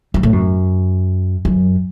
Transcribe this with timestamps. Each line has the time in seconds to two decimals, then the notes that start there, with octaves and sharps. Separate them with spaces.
0.14 F#2
0.23 A2
0.33 F#2
1.45 F#2